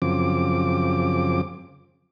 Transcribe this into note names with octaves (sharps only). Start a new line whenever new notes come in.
F#2 C#3 F3 C4 D6